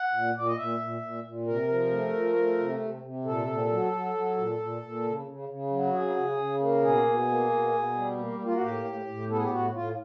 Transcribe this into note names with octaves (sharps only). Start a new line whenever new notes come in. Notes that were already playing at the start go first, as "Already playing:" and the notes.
Already playing: F#5
A#2
A#2 D5
D#5
A#2 E5
A#2
A#2
A#2
C3 A#4
F3
A3
F3
A3
C3
C3
C3
A#2 A4
A#2
F#3
F#3
F#3
A#2
A#2
A#2
C#3
C#3
C#3
F#3
C#3 G#4
C#3
C#3
A#3
B2 G#4
B2
A#3
B2
B2
G3
A#3
A#3
F4
F#4
A2 G4
A2
A2
B3 A4
G#4
G4
A2 F#4
A2 F4